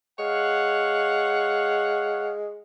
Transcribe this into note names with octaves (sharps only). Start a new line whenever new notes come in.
G#3 C#5 F5 F#5